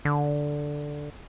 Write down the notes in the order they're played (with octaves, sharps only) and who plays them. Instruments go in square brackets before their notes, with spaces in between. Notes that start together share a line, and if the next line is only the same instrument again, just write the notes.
[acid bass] D3